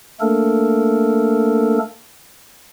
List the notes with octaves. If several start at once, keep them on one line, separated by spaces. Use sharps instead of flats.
A3 A#3 D4 A4 A#4